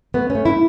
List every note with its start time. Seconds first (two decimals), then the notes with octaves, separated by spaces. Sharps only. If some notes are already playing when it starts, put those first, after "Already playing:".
0.14 A3 B3
0.30 C#4
0.35 A3
0.45 E4